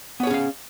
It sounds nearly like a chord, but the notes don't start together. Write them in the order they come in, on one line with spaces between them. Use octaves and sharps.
B3 C#5 G#4 C#4 F5